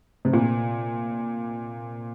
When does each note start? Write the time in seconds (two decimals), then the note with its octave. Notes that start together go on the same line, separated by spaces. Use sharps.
0.25 C3
0.33 A#2